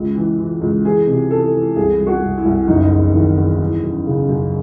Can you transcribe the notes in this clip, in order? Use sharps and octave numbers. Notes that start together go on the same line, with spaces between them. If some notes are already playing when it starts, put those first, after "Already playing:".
Already playing: C#2
E3
E3
C#2
E3 G#4
C3
E3 A4
E3
C2 G#4
C2
F#4
C2
E4
C2
F#1 D#4
E2
D#3
E2
E3
F#2
C#3
F#2